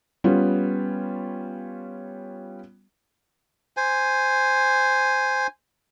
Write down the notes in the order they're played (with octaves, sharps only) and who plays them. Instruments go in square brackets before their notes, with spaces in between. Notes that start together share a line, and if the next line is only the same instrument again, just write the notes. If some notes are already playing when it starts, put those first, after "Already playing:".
[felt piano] G3 B3 C#4 F4
[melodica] C5 G#5